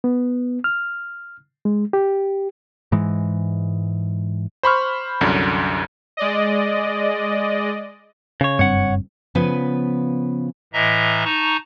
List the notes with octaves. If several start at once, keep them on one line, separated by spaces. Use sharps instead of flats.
B3
F6
G#3
G4
G#2 E3 G#3
C5 B5 C#6 F6
C2 F#2 D3
G#3 D5 D#5
C#3 C#5
F#1 G2 C4 C#5 F#5
C#3 F3 B3 B4 G#5
A2 E3 D#5 E5 A#5
D#4 A5 A#5 C#6